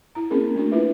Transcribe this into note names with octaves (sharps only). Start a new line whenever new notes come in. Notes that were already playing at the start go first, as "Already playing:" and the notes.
E4 A#5
A#3 C4 C#4 G#4 A#4
A3 A#3 D4 F#4
C#4 E4 F4 B4 E5